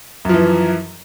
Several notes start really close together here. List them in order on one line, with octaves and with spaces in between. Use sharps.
F#2 F3 E3